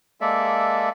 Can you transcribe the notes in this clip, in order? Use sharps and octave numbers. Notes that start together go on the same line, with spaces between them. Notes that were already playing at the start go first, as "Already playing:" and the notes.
G#3 A#3 A4 D5 E5